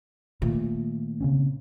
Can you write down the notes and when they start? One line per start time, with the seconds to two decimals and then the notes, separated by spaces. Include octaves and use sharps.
0.42 A#2 D#3 A3
1.21 C#3 C4 C#4